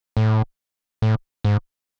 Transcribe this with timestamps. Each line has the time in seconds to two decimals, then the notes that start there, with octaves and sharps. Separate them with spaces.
0.17 A2
1.02 A2
1.44 G#2